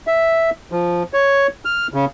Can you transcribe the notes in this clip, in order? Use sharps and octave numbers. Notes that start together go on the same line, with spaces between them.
E5
F3
C#5
F6
C#3